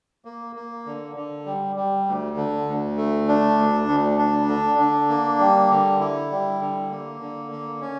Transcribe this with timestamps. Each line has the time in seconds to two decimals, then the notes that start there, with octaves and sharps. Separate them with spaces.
0.25 A#3
0.56 A#3
0.86 D3
1.16 D3
1.46 G3
1.76 G3
2.07 D2
2.36 D3
2.68 D2
2.97 A3
3.28 D4
3.58 D2
3.88 D2
4.19 D4
4.48 D3
4.79 D4
5.09 A#3
5.39 G3
5.70 D3
6.00 E4
6.31 G3
6.60 D3
6.90 A#3
7.21 D3
7.52 A#3
7.81 C#4